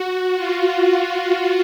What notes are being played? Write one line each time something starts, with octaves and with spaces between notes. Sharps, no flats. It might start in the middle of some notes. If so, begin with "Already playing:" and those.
Already playing: F#4
F4